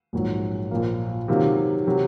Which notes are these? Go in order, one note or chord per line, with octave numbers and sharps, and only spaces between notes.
A#1 G#2 F#3
A#1 A#2 F3 A#3
C3 D#3 F#3 A#3 F4
C3 F#3